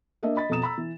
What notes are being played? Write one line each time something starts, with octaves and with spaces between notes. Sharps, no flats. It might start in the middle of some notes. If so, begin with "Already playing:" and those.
A#3 D4 D#5 E5
D#5 B5 A6
F2 B2 A#5 D#6 E7
A#5 B5 E6
E3